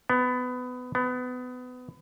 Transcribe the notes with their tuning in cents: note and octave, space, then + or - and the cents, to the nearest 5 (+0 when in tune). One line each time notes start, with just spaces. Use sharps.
B3 +20
B3 +25